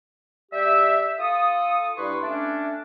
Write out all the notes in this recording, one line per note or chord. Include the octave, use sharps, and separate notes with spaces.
G3 G4 E5
F4 A4 D#6
G2 E4 B4 C6 C#6
A3 C#4 D4